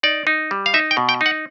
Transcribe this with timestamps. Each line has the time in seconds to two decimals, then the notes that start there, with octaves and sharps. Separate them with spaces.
0.03 D#4 D5
0.27 D#4
0.51 G3
0.66 F5
0.74 D#4 E5
0.91 G5
0.97 B2
1.09 G5
1.21 D#4
1.26 F#5